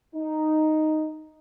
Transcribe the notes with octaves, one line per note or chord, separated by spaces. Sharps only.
D#4